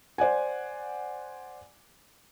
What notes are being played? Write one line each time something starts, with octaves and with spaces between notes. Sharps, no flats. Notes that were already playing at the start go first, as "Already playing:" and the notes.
C5 D5 F#5 G#5